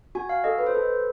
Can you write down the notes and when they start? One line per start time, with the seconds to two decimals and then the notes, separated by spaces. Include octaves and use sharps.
0.15 F#4 G#5
0.29 F5
0.44 A4 D#5
0.58 B4
0.67 C5
0.74 A4 B4